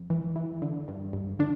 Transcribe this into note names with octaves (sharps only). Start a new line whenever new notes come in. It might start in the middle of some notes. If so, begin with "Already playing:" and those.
Already playing: F2
E3
E3
D3
G2
G2
D3 D4